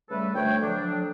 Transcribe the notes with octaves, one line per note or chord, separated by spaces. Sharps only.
C#3 G3 A3 A4 B4
D2 A3 C#5 G5
D3 F3 F#3 D4